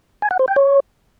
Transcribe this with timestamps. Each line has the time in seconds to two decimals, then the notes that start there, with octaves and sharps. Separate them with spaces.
0.22 G#5
0.31 F#5
0.39 C5
0.48 G5
0.56 C#5